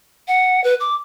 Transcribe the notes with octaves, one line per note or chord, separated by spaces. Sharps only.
F#5
B4
D6